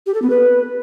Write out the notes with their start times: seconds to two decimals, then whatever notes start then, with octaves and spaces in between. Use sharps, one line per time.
0.06 G4
0.14 A4
0.22 B3
0.30 B4